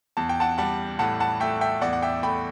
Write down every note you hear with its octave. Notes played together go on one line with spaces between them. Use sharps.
E2 A5
G5
F#5 A5
G3 F#5 A5
A2 F#5 A5
F#5 A5
A3 E5 G5
E5 G5
E2 D5 F#5
F#5
E5 G5
A3 G5 B5